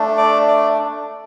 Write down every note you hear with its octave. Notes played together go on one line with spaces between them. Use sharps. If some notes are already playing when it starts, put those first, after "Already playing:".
Already playing: A3 D4
D5
D5